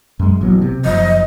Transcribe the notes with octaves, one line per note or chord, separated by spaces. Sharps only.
F#2 G#3
A1 F#3 B3
C3
F#1 F3 D#5